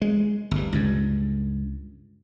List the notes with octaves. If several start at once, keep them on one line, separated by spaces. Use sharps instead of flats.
G#3
G1 G2
C#2 G2